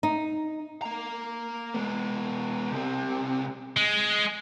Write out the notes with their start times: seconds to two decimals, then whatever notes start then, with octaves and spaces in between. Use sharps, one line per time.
0.03 D#4
0.82 A#3 A#5
1.74 G#3 B3
2.71 C2 C3
3.77 G#3